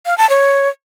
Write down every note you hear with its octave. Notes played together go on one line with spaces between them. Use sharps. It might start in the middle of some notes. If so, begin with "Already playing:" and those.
F5
A5
C#5